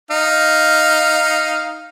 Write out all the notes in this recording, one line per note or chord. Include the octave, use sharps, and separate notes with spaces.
D#4 F5